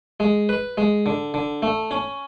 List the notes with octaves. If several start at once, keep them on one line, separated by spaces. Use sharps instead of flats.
G#3
B4
G#3
D3
D3
A3
C#4